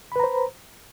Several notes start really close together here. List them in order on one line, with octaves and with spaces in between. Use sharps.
B5 B4 A#5 C5